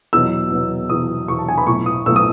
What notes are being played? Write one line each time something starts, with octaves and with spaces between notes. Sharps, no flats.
E2 B2 F#3 E6
E2 B2 F#3
E2 B2 F#3 D#6
E2 B2 F#3 C#6
A5
G#5
B5
B1 A2 E3 A3 C#6
D#6
B1 A2 E3 A3 E6
D#6